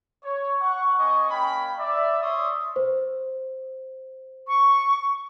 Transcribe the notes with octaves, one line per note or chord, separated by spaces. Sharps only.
C#5
F#5 C#6
C4 D#5 G#5 C#6
A#3 C#4 G5 B5
D5 E5
C#5 D5 E5 C6 C#6 D#6
C5
C#6